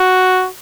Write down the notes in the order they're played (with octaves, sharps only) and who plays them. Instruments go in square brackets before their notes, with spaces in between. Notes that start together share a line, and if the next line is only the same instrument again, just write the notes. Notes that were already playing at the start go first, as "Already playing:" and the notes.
Already playing: [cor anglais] F#4